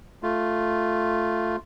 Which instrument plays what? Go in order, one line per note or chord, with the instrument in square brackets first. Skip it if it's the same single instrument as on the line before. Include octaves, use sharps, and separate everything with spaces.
[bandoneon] A3 F4